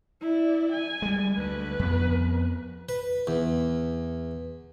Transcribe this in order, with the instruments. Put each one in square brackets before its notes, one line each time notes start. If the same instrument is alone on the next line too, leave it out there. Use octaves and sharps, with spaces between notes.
[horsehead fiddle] E4 D5
G#5
[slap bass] G3 G#3
[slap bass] D2 [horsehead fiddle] B4
[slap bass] F2 B3
[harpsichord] B4
E2